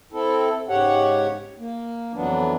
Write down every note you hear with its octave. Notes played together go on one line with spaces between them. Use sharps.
C4 E4 A4
G#2 C#3 G4 C#5 F#5
A#3
F2 E3 F#3 B3 D4